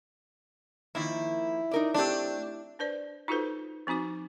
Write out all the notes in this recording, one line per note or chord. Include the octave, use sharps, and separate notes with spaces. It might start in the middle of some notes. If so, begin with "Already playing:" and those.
D#3 F3 A#3 E4
D#4 A#4 D5
A3 C4 D4 G4
D4 B4 C5 D5
D#4 F4 F#4 A4 B4 C5
F3 C4 D#4 F#4 D6